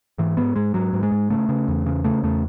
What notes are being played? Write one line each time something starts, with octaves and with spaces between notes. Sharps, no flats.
G#2 E3
G#2 B3
G#2 G#3
G#2 F#3
G#2
G#3
G#2
C#3 A3
C#3
E2
C#3
C#3 A3
E2 A3